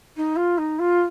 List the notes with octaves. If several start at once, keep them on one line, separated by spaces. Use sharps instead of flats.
D#4
F4
D#4
F4